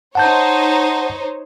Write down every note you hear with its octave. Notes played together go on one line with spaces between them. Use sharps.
D#4 C5 C#5 F#5 A5 G6